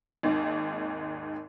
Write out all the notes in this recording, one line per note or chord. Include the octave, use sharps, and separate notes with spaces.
G#1 D#2 G#2